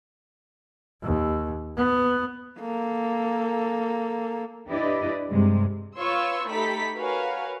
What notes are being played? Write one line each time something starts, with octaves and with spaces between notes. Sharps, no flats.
D#2
B3
A#3 A4
D4 E4 G4 B4 D5 D#5
G2 C3 G#3
F4 B4 C#5 C6 C#6 E6
A3 D#4 G4 A4 B5 B6
F#4 A#4 B4 C#5 F5 G#5